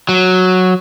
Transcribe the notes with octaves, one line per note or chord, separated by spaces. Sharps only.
F#3